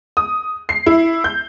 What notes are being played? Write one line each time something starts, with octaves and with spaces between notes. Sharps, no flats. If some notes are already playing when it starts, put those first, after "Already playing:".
D#6
C7
E4
G6